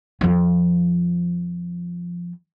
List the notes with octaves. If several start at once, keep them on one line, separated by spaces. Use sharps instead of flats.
F2 F3